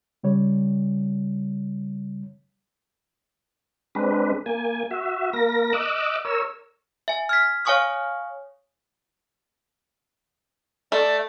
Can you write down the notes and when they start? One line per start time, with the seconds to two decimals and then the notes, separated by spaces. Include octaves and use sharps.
0.23 C#3 G3 C#5
3.95 G#3 C4 D4 B4
4.46 A#3 G#5
4.91 F#4 E5
5.33 A#3 A#4 A#6
5.73 D#5 D6 E6 F#6
6.25 A#4 C#5 E6
7.08 E5 G#5
7.29 F6 G#6 B6
7.65 C#5 F5 G#5 C#6 D#6 F6
10.92 A3 D5